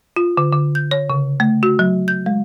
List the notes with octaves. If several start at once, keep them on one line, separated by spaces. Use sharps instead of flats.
F4
D3
D3
G6
C#5
C#3
A3
F#4
F#3
G6
G#3